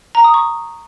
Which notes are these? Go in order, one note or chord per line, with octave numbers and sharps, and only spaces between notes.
A#5
D#6
C#6